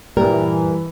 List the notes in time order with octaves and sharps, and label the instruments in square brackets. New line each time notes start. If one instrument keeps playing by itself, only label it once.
[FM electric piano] G2 A#2 [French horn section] E3 [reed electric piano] G3 [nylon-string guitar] A#4